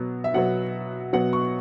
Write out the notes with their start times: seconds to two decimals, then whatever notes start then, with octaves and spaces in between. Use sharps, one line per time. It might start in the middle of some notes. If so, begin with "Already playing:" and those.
Already playing: B2 F#3 B3
0.24 E5
0.34 B2 F#3 B3 F#5
1.13 B2 F#3 B3 F#5
1.33 C#6